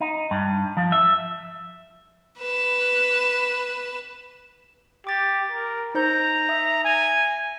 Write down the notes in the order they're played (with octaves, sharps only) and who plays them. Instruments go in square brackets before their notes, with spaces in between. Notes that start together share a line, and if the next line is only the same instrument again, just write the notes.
[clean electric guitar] D#4
G2
F3
E5
[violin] B4 E7
[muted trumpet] G4 [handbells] D6 A6
[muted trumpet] A#4
[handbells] D#4 C5 G6 [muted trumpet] A#5
[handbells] E5 D#6
[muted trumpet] G#5